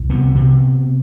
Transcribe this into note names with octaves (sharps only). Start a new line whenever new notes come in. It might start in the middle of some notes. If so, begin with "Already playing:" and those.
Already playing: C2
C3 B3
C3